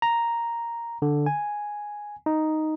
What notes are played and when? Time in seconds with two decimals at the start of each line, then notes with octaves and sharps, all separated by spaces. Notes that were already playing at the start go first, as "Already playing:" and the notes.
0.02 A#5
1.02 D3
1.26 G#5
2.26 D#4